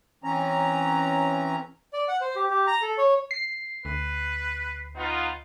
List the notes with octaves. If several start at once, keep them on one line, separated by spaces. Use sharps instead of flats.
E3 C4 C#4 A#5
D5
F#5
C5
G4
G4
A#5
A4
C#5
C7
D2 B4
B3 D#4 F4